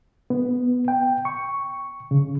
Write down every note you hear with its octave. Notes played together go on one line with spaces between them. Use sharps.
B3
G5
C#6
C#3